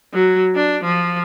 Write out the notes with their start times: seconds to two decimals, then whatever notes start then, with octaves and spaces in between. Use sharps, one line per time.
0.14 F#3
0.56 D4
0.84 F3